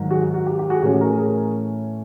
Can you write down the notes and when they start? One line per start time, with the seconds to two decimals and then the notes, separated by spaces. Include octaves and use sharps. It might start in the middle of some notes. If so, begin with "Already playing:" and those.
Already playing: G#2 D#3 F#3
0.11 F#4 G#4
0.34 F#4
0.46 G4
0.59 G4
0.70 F#4 G#4
0.82 A2 E3 A3 C#4 F#4 G#4
1.00 G#4 A#4
1.18 G#4 A#4